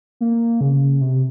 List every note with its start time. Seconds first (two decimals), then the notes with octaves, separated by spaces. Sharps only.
0.21 A#3
0.61 C#3
1.01 C3